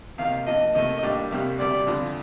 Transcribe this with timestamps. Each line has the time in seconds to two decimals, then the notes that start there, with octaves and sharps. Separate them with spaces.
0.18 C3 D#3 A#3 D#4 F5
0.46 G2 F3 A#3 D#5
0.75 C3 D#3 A3 D#5
1.03 A2 G3 A#3 D4
1.31 C2 C3 G3 A#3
1.59 D2 C3 G3 D5
1.87 F2 D3 F3